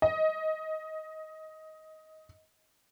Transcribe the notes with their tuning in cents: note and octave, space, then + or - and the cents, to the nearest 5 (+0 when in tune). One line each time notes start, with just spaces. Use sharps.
D#5 +15